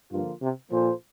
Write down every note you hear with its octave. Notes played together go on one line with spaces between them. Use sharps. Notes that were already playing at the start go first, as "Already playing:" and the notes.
G2 D3 F3 A#3 F4
C3
A#2 F3 A#3 F4 A4 C5